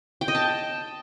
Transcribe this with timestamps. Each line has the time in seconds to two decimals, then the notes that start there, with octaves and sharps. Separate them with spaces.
0.21 G5
0.28 D#5
0.35 A5